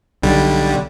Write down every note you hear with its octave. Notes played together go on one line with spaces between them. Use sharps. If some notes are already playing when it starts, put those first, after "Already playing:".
B1 D3 G3